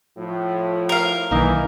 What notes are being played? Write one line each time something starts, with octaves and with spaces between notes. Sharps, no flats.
A2 F3
A#4 F5
B1 D#3 E3 A#3 D#4 D#5